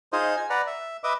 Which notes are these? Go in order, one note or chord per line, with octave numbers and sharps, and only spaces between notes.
D#4 F4 G#4 C5 D#5
G#5
B4 D5 F#5 A#5
E5
B4 D#5 E5 D6